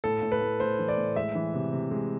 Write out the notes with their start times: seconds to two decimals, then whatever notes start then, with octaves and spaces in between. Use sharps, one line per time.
0.04 A2 A4
0.22 A2
0.32 B4
0.41 A2
0.60 A2 C5
0.79 E3
0.88 D5
0.97 A2
1.16 G#3 E5
1.35 E3
1.54 C3
1.73 C3
1.91 G#3